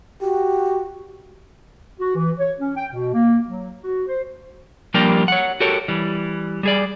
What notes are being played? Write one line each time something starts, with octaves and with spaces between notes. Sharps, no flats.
F#4 G4
F#4
E3
C#5
C#4
G5
B2
A#3
F#3
F#4
C5
F3 G3 A#3 D4 G4 A#4
C#5 F#5
F#4 G4 A4 A#4 C#5
E3 G3
G3 G#4 D5